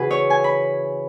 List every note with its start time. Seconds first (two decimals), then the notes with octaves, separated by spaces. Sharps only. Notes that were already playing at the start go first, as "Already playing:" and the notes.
Already playing: C#3 E3 C#4 E4 F#4 G#4 B4
0.11 C#5
0.30 G#5
0.44 B5